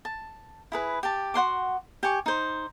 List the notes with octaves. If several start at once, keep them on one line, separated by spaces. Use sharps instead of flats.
A5
E4 G#4 B4
G4 A5
F#4 F#5 C6 D6
G4 G#5 C#6
D#4 C5